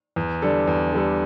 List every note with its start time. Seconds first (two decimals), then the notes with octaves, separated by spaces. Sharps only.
0.16 E2
0.42 D3 G3 D4 A4
0.67 E2
0.93 D3 G3 D4 A4